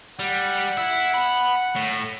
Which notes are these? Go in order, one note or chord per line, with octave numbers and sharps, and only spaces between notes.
G3 F#5
E4
B5
A2